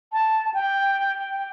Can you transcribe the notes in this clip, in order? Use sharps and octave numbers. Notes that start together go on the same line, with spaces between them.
A5
G5